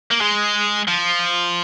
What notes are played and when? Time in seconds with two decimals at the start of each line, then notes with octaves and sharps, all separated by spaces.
0.11 A#3
0.21 G#3
0.88 F3